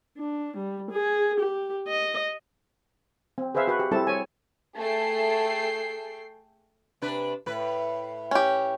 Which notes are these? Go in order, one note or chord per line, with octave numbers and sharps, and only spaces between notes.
D4
G3
G#4
G4
D#5
C4
G#4 B4 C5 E5 F5
F#4 B4
G4
G3 C4 E4 A4 A5
C#5 G#5
A3 G#4 A4 G5 C7
C3 D4 B4
A2 B4
C#4 G4